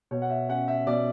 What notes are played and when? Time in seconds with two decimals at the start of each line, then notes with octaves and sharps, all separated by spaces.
0.11 B2 C#5
0.22 F#5
0.30 E5
0.49 C#4 F#5
0.68 E5
0.87 B2 D5